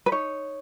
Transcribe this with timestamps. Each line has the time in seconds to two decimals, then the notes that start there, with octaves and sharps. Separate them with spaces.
0.06 B4
0.12 D#4 C#5